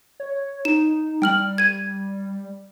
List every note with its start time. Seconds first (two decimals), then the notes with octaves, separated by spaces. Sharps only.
0.20 C#5
0.65 D#4 E7
1.22 G3 G5 F6 F#7
1.58 G#6 D#7